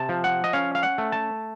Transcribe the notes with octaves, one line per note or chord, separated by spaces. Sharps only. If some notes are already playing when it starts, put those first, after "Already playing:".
Already playing: C3 A5
F3
F#5
D#5
C#4 F5
F5
F#5
A3
A5